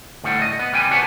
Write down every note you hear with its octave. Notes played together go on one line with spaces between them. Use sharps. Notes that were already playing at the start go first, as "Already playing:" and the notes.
D2 A2 G3 F#5
D#5
B3
C2 G3 G5 G#5
D3 G4 B4 C#5 F#5 A5